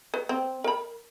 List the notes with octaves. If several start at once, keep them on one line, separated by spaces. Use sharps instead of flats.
B4
C4
A#4 B5